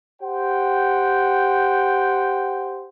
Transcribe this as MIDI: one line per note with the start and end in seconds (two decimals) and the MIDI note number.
0.21 2.89 67
0.21 2.89 72
0.21 2.89 78
0.21 2.89 79